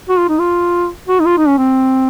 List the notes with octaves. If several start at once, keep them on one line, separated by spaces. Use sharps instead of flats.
F#4
F4
D#4
F4
F#4
D#4
F4
D#4
C#4
C4